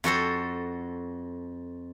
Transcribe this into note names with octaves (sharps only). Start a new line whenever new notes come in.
F2 F#4 A4 C5